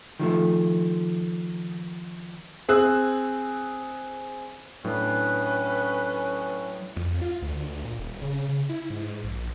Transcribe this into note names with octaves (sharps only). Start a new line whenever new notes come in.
D#3 F3 A3
C4 G#4 E6 F#6
A2 F#3 C#4 D4 B4
F2
F4
D2
A#2
D#1
C#3
C#3
E4
G#2
A#1